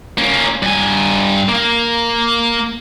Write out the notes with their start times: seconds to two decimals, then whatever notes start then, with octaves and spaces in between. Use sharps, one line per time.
0.18 A#3 C#4
0.62 G2 G#5
1.49 A#3